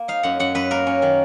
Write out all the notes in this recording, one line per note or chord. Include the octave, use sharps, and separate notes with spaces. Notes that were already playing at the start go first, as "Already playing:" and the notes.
Already playing: A#3
D#4 F5
F#2 F#5
F#2 F#5
F#2 B4
A#3 A#4
C#4
D#3